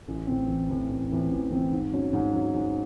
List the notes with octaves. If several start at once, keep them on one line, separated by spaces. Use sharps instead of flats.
A1
A2 E3 C4
A1
A2 E3 C4
A1
A2 E3 C4
A1
A2 E3 C4
G#2
F#3 C#4
G#2
F#3 C#4
G#2